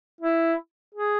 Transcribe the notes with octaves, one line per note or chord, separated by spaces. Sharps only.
E4
G#4